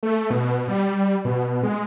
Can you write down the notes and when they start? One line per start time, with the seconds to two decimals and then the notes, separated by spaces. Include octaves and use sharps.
0.03 A3
0.30 B2
0.68 G3
1.25 B2
1.63 G#3